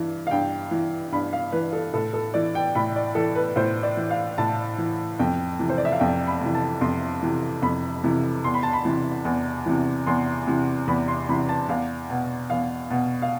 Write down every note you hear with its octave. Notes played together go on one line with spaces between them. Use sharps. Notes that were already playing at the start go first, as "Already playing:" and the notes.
Already playing: G2 E3
F5
G2 G5
E3
G2 B5
F5
E3 B4
A4
A2 A4
A4
E3 D5
G5
A2 B5
D5
E3 A4
B4
A2 C5
D5
E3
F5
A2 A5
E3
F2 G5
C3 E3
C5
D5
E5
F5
F2 G5
B5
C3 E3
A5
F2 C6
C3 E3
F2 B5
C3 E3
E2 C6
B5
A5
B5
C3 E3
E2
C3 E3
E2 C6
C3 E3
E2 B5
C6
C3 E3 B5
A5
E2 F5
B2
E2 F5
B2
F5